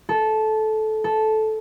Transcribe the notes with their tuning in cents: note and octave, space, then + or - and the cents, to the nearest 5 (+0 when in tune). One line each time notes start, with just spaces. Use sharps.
A4 -15
A4 -10